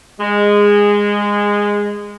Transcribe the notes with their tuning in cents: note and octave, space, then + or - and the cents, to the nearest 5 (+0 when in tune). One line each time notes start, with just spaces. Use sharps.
G#3 -15